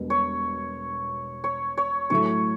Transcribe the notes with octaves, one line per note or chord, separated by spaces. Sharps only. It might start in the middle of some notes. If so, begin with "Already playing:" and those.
Already playing: E1 B2 G3
C#5
C#5
C#5
A2 F#3 A3 C#5